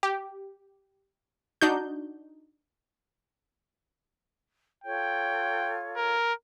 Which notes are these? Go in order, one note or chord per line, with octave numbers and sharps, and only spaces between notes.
G4
D4 D#4 F#4 G6
F4 A4 C#5 G5
A#4